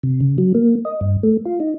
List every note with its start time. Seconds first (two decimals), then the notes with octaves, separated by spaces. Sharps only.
0.03 C3
0.20 C#3
0.38 F#3
0.55 A#3
0.85 D#5
1.01 G2
1.23 A3
1.46 F4
1.60 D#4